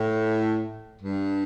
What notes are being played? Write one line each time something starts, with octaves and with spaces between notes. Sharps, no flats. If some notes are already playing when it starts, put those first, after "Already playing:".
Already playing: A2
G2